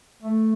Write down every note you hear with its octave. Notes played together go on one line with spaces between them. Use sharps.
A3